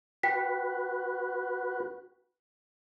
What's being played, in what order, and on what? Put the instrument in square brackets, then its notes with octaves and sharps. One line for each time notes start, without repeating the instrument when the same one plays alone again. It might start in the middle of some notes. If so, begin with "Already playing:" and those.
[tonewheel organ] F#4 B4 [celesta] G5 B6